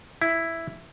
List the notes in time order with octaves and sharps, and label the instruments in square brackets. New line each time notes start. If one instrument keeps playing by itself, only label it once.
[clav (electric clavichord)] E4